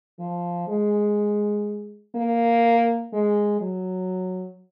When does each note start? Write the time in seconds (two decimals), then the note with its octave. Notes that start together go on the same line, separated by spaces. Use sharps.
0.20 F3
0.68 G#3
2.15 A#3
3.13 G#3
3.61 F#3